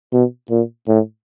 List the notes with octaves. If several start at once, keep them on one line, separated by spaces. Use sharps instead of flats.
B2
A#2
A2